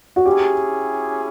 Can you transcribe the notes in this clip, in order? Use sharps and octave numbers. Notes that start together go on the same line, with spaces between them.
F#4
C#4 E4 G4 G#4